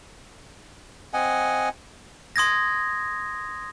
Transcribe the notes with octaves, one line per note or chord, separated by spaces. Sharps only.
C4 D#5 F#5 G#5
C6 D#6 G#6 A#6